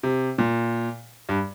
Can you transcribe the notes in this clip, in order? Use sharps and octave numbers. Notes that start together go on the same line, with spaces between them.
C3
A#2
G2